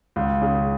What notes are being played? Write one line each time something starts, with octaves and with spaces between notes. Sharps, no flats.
C#2
C#3